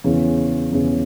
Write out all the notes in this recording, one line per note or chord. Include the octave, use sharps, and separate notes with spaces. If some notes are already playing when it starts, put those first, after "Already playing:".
E2 C#3 E3 C#4
E2 C#3 E3 C#4